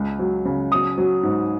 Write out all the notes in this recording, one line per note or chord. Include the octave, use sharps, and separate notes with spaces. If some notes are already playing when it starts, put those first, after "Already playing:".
Already playing: C#2
F#3
C#3
F#3 D#6
F#3
G#2